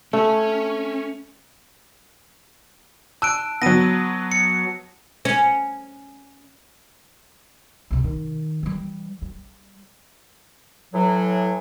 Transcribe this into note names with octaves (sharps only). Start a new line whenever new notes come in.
A3 C#4
A5 E6 F#6 D7
F#3 B3 A#6 D#7
C#7
C#4
C2 C3
D#3
E3 G3
G3
A2 E3 F#3